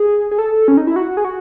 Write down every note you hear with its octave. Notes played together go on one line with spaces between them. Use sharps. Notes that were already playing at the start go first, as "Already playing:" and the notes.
Already playing: G#4
G#4
A4
C#4
D#4
E4
F#4
G#4
F#4